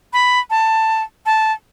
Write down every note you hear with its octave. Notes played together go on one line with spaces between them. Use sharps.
B5
A5
A5